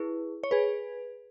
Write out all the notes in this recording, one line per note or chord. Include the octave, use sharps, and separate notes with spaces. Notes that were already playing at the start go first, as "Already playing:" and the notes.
Already playing: E4 G#4 B4
C#5
G#4 B4